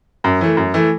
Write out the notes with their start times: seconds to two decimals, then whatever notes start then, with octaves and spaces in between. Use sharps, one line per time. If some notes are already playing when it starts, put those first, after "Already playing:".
0.24 F#2
0.41 E3 A3
0.57 F#2
0.74 E3 A3